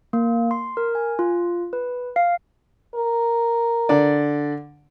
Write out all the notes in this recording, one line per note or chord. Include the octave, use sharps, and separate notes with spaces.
A#3
C6
A#4
G#5
F4
B4
F5
A#4
D3 D5